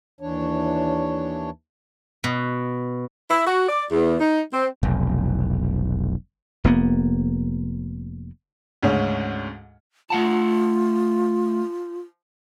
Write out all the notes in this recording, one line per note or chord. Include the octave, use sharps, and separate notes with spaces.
D#2 E3 D4 C#5
B2
E4
F#4
D5
E2
D#4
C4
F1 B1
F1 A#3 B3
D2 G#2 C#3 C#4
A3 F4 F#5 A5